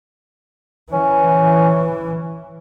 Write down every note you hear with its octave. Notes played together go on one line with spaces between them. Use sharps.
E3 C#4